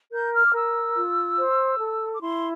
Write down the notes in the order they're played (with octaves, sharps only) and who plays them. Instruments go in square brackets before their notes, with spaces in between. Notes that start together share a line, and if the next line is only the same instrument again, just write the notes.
[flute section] A#4 G6
F6
D6
A#4 E6
F4
C5
A4
D6
E4 C6